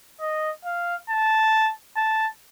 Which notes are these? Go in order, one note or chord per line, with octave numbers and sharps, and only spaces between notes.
D#5
F5
A5
A5